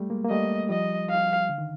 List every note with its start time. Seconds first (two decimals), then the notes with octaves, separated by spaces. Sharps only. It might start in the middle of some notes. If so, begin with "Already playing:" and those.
Already playing: G3 A3
0.10 G#3 A#3
0.24 A#3
0.30 G3 A3 D#5
0.69 F3 G3 D#5
1.10 F5
1.49 D3
1.58 D#3